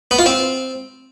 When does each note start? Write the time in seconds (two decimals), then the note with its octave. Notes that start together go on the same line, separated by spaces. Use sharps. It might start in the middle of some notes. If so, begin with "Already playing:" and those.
0.11 B3
0.19 F4
0.26 C4